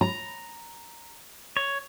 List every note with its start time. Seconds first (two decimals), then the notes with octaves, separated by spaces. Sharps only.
0.01 A#5
1.57 C#5